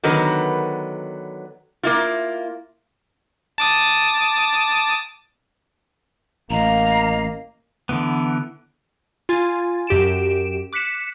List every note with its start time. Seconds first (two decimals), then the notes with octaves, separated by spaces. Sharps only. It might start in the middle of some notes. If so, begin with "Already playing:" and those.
0.03 D3 D#3 F#3 B3 A#4 B4
1.83 A#3 E4 F4
3.58 A5 D6 D#6
6.50 A1 A#3 D#5 F5 A#5
7.89 D3 E3 B3
9.29 F4 G#5 A6
9.87 F#2 G4 D7 E7
10.73 D6 F#6 B6 C#7 E7